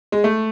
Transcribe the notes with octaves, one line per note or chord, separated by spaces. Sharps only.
G#3
A3